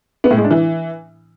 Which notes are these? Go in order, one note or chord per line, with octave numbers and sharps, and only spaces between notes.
B3
A2
G#3
D4
E3